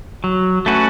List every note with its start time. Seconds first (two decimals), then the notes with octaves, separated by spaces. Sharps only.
0.24 F#3
0.66 A3 C#4 F#4 B4